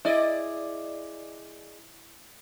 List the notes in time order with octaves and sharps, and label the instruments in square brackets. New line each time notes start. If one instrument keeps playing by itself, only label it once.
[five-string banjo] E4 [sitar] G#4 D5 D#5